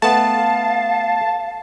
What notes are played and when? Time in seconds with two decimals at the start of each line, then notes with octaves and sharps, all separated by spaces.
0.02 A3 B3 F5 A5